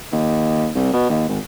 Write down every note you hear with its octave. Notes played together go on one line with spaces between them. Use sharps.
D#2
C2
B2
D#2
G#1